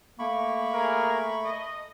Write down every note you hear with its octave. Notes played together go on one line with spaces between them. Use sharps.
A3 A#3 B5 C#6
G#4 A#4
D#5